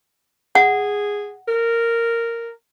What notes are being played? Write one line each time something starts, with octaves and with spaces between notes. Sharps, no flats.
G#4 F#5
A#4